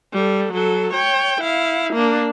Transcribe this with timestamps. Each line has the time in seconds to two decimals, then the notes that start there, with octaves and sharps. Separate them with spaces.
0.13 G3 A4
0.53 F#3 A4
0.93 C#5 G5
1.42 E4 F5
1.94 A#3 D4